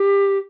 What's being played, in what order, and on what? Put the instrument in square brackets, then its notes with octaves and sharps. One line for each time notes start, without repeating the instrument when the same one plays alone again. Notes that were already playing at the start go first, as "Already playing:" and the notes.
Already playing: [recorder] G4